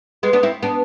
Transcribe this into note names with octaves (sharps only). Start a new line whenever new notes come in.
G#3 B3
B3 D4
C4 E4
B3 D4